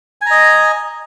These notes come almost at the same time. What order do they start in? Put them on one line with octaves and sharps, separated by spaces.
G#5 A#5 D#5